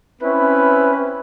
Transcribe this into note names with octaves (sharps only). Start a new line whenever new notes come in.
C4 C#4 E4 B4